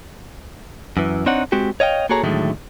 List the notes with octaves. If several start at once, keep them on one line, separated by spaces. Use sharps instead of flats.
F#2 E3
C4 D4 D#4 C#5 F#5
G#3 C4 F#4 G4
C#5 D#5 F5 G5
A#3 F#4 G#4 A4 C#5 A#5
A2 D3 D#3 F#3 G#3 A3